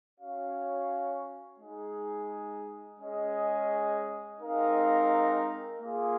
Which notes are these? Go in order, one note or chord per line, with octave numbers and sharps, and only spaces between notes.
C#4 F#4 C#5 F5
G#3 D#4 G#4
G#3 C#4 G#4 D#5
G#3 C4 D#4 A#4 F5
A#3 F4 G#4